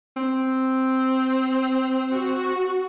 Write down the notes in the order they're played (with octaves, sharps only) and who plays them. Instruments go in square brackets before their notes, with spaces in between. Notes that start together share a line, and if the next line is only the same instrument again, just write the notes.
[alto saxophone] C4
[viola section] F#4